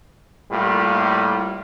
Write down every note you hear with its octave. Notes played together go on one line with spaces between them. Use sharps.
A2 G3 A#3 F4